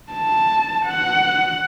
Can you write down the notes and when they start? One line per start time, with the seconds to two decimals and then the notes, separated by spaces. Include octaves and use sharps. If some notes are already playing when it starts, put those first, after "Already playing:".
0.13 A5
0.86 F#5